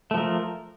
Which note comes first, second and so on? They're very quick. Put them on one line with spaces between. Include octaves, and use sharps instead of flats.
A3 F3 A#4